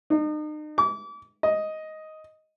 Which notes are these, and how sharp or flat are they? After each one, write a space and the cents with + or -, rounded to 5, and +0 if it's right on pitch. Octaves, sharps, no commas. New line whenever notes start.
D#4 -40
D6 -35
D#5 +5